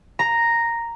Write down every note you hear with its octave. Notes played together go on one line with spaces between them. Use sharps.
A#5